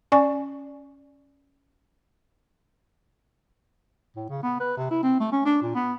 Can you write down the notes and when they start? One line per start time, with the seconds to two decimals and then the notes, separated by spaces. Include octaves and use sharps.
0.12 C#4 D5 G#5 C#6
4.16 A2
4.29 C#3
4.43 B3
4.60 B4
4.77 C3
4.91 E4
5.03 C4
5.20 A3
5.32 C#4
5.45 D4
5.62 A#2
5.75 B3